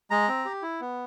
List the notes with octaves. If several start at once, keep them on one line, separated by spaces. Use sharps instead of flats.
G#3 A#5
C4
G4
E4
B3